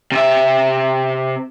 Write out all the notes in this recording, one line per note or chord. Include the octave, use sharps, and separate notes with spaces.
C3 E5